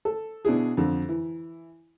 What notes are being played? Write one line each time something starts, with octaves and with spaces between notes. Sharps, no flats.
A4
B2 D4 E4 G#4
F2 D3
E3